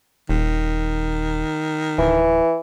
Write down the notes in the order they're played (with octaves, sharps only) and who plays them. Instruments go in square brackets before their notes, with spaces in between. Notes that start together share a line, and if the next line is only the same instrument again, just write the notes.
[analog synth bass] D#1 [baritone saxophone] D#3
[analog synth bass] D1 [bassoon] E3